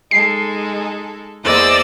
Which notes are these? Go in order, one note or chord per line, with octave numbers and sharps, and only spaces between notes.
G#3 D#4 A4 C7
E2 A#3 C5 D5 D#5 E6